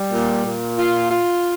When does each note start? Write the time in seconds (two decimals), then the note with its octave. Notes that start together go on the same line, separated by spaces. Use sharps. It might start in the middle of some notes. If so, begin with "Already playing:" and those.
Already playing: G3
0.12 A#2
0.45 A#2
0.77 F4
1.11 F4